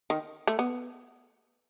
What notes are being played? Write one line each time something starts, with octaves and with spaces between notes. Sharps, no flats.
D#3
A3
B3